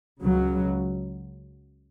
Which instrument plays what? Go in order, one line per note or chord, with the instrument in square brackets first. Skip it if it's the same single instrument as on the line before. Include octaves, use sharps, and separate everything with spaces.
[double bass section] C#2 C#3 F#3